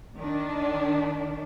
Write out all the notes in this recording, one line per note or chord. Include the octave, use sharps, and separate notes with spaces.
D#3 D4